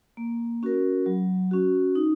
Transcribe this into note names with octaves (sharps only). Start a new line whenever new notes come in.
A#3
C#4 F#4 A#4
F#3
C#4 F#4
D#4